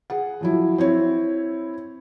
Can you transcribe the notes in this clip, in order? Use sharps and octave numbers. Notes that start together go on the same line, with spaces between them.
G#4 F#5
F3 F#3 E4
C4 E4 C#5